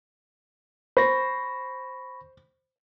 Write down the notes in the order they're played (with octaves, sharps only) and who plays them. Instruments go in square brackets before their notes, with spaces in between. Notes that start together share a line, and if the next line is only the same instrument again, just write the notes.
[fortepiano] C5 [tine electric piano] B5 C#6 A#6